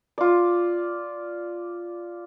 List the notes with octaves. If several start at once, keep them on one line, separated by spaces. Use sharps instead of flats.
F4 D5